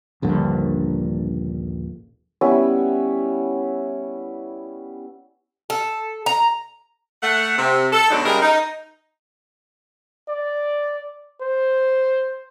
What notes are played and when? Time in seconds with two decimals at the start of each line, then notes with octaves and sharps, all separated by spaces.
0.22 D#1 A#1 G2 D3
2.41 G3 B3 C#4 E4
5.70 A4
6.26 A#5
7.23 A3 F#5
7.58 C3
7.93 A4
8.11 D2 B2 F#3 G#3 D4 D#4
8.25 C#3 G3 G#3 G#4 A#4
8.42 D#4
10.28 D5
11.40 C5